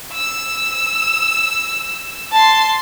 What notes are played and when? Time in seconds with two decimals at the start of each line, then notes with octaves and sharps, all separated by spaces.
0.12 E6
2.31 A5 C6